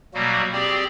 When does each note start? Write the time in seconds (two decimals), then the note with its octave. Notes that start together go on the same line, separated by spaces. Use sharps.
0.14 B2 F#3 G3 A#3 F#4
0.53 C4 G4 G#4 D5